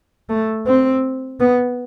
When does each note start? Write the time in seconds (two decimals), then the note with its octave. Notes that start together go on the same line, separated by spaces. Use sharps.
0.29 A3
0.67 C4
1.40 B3